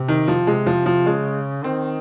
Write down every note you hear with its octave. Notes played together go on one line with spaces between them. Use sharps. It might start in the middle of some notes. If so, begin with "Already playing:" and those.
Already playing: C3
D#3
F3
C3 G#3
F3
F3
C#3 G#3
D#3 C4